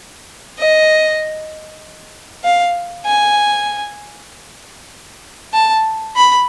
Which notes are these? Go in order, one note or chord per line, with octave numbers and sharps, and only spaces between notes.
D#5
F5
G#5
A5
B5